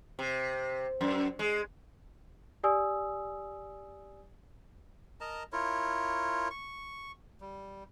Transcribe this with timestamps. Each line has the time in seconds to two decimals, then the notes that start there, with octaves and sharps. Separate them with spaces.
0.19 C3
1.01 F#2
1.39 G#3
2.64 G4 D5 G#5 D#6 E6
5.21 A#4 D#5 A5 A#5
5.53 E4 F4 A#4 C#5
6.50 C#6
7.41 G3